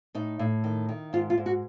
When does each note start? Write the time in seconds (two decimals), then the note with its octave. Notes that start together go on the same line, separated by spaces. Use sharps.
0.15 A2 D#4
0.39 A2
0.64 D#3
0.89 D#3
1.13 G#2 F4
1.30 F4
1.38 G#2
1.46 F#4